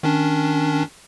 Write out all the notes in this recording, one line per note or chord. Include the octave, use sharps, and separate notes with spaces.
D#3 C#4 D4